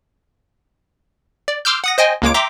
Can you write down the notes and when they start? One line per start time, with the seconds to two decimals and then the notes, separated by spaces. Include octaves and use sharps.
1.48 D5
1.65 C6 D6 E6 F6 G6
1.84 F#5 D#6 A#6
1.98 C5 D#5 G5 G#5
2.22 C#2 G#3 A#3 C#5 D6 D7
2.34 E5 G5 A#5 C6 D6